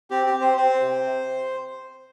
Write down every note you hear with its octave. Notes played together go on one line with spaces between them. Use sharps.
C4 G4
G4
C4
C5
C4 C5
C3